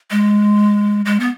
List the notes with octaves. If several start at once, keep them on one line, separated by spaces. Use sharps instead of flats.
G#3
G#3
B3